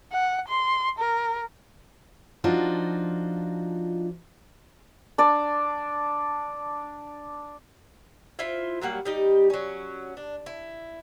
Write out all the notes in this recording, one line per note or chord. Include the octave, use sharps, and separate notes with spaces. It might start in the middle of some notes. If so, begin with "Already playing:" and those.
F#5
C6
A#4
F3 D4 D#4 F4 F#4
D4 D5
E4 F4 C5 E5
F#3 G3 A#3 F#5
G3 D#4 G4
F#3 C#4
D4
E4